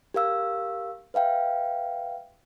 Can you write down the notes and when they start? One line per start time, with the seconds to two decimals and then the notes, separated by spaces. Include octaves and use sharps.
0.14 G4 A#4 F5 E6
1.14 B4 E5 F5 G5